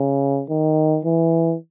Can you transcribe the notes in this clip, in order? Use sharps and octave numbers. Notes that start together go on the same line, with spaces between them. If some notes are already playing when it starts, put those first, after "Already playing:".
Already playing: C#3
D#3
E3